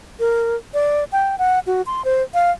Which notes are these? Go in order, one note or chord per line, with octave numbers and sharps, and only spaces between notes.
A#4
D5
G5
F#5
F#4
C6
C5
F5